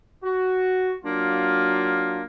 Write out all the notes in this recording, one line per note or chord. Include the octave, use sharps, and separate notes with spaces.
F#4
F#3 A#3 D4 F4